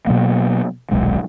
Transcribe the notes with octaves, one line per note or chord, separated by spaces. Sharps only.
B2 F#3 A#3
D#1 B1 G#3